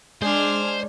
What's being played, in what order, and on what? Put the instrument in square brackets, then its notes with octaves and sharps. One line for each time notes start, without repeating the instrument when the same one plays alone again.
[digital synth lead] G#3 [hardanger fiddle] D4 [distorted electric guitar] C5 [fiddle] G#5 F6